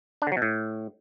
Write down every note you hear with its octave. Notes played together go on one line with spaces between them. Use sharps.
D4
D3
F#3
B2
A2